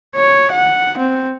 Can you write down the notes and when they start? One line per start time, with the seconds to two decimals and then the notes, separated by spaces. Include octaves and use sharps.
0.16 C#5
0.52 F#5
0.98 C4